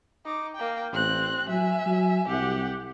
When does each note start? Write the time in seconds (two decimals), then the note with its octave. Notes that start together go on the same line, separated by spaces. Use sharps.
0.25 D#4 D6
0.55 A#3 G5
0.93 A1 C4 F#6
1.49 F#3 E5 G#5
1.86 F#3
2.28 C2 G4 F#5